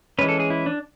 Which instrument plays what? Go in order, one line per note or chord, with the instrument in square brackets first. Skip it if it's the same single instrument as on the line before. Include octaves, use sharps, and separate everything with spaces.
[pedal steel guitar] E3 G#3 C#4 B4
A4
G#4
E4
D4